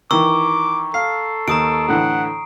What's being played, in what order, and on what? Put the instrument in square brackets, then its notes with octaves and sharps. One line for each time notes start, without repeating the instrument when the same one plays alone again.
[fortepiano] D#3 E3 [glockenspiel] A#5 C#6 E6 [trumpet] D6
[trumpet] A4 [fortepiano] F5 [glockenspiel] C7
[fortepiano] D#2 [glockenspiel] A#5 D#6 D7
[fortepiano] A2 D3 E3 [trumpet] F#5